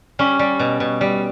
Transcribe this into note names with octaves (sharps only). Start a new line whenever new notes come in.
G3 C#4
G3
B2
B2
G3